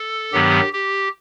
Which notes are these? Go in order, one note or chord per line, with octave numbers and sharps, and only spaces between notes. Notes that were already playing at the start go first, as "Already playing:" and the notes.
Already playing: A4
G2 D#3 F#3 B3 G4
G4